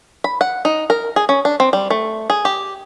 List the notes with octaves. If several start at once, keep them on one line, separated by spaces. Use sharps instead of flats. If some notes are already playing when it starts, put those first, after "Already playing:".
B5
F#5
D#4
A#4
G#4
C#4
D4
C4
G3
A3
G#4
G4